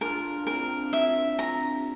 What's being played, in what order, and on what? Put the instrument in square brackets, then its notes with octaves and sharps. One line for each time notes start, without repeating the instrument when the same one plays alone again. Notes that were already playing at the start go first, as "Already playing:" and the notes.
[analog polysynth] D4 F4 [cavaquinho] A#4
[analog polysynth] C4 E4 [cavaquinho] A#4
[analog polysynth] D4
[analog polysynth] C4 E4 [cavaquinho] E5
[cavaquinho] A#5
[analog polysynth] G4